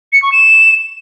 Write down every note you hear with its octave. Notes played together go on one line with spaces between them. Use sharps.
C#7
C#6
E7